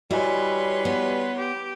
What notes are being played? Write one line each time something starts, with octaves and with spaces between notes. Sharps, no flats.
G3 E4 F#4 B4 C#5 D#5 G#5 C6
B3
G4